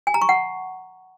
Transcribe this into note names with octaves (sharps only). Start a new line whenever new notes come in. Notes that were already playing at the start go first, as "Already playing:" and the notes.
G#5
A#5
C#6
F#5